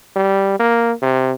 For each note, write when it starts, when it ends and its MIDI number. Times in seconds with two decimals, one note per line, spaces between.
0.16 0.58 55
0.59 0.92 58
1.02 1.33 48